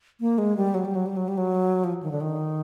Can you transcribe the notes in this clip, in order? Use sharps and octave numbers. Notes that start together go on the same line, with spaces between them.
A#3
G#3
G3
F#3
G3
F#3
G3
F#3
G3
F#3
F3
D#3
D3
D#3